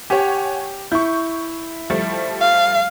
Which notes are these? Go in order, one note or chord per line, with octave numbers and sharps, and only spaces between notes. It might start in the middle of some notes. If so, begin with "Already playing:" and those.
G4 C#5 F#5 G#5
E4 C#6 G6
F3 G3 A3
F5